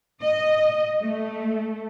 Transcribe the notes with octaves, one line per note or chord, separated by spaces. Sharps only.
D#5
A3